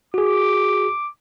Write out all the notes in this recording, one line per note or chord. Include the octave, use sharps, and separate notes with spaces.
F#4 G#4 D6